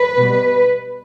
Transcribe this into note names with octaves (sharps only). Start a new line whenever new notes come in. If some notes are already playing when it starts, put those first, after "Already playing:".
Already playing: B4
B2 G3